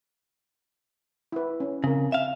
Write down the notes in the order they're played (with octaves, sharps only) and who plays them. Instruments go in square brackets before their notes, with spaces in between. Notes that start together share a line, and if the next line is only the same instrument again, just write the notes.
[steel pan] E4 B4
C#4
[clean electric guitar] C#3 [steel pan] C4 A#4
[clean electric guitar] E5 F5